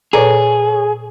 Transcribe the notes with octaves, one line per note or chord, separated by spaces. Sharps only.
A#2 G#4 A4 B4 C#5 D5 A#5